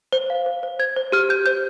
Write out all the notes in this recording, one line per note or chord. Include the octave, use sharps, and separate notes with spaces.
C5
F5
C5
C5
C5 G#6
C5
G4 F6
G4 G6
C5 G6